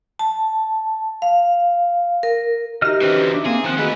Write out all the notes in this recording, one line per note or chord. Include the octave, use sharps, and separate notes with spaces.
A5
F5
A#4
D#4 F#4 G4 D#5 E5 F6
D3 E3 C4 C#4 B4
D4 E5
A#3 C4 G#4
D#3 F3 A#3 C4 F#5
A3 F#4 G#4 B4 D#5